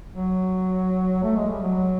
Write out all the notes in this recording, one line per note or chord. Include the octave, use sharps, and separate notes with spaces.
F#3
A3
G#3
G3
F#3